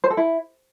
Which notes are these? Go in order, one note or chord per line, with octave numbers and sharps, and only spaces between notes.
C5
A4
E4